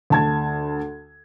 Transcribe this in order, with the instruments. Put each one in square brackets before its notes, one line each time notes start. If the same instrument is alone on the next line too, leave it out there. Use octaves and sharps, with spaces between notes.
[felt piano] D2 A5 G#6